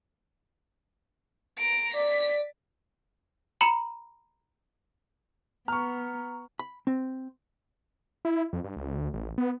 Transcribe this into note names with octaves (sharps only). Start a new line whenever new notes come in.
A#5 D7
D5 B6
A#5 B5 C#7 F#7
B3 A#5 C#6 F6
B5
C4
E4
F2
G2
C#2
D2
A1
B3